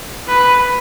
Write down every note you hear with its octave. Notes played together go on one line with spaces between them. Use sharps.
B4